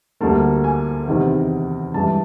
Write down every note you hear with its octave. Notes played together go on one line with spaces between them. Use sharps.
D2 D3 G3 A#3 A5
G#5
E2 C3 D#3
G2 E3 G#3 A5